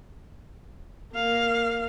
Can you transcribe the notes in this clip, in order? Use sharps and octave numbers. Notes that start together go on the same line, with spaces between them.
A#3 F5